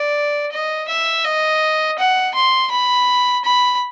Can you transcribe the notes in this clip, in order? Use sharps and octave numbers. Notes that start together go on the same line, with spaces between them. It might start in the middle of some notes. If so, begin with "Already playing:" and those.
Already playing: D5
D#5
E5
D#5
F#5
C6
B5
B5